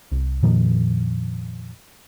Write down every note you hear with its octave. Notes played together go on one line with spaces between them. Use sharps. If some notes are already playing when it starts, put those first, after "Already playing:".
C2
F2 A#2 D#3 F3